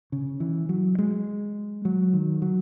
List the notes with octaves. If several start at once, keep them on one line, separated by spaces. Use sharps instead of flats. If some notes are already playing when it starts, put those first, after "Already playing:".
C#3
E3
F#3
G#3
F#3
D#3
F#3